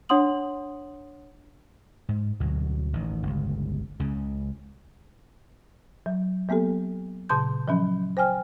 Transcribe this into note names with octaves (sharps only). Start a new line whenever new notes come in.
D4 C#5 F#5 C6 D#6 F#7
G#2
D2 B2 F#3
A1 D#3
G1 C#2
C#2 C#3
F#3
F#3 A#3 B3 G4 A4
A#2 C#3 A5 C6 G6
F3 F#3 C#4
C5 G5 G#5 F6